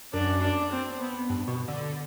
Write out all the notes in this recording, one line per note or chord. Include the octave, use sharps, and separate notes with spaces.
F#2 D4
D4
C4
B3
G2
B2
D3